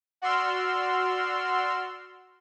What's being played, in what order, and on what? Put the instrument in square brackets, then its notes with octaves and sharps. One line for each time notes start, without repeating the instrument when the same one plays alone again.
[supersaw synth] F#4 D5 C6 E6 F6